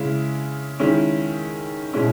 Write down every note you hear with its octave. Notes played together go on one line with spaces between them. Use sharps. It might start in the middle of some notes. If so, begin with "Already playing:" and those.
Already playing: C#3 G#3 C#4 E4
D#3 G#3 C#4 E4
B2 G#3 C#4 E4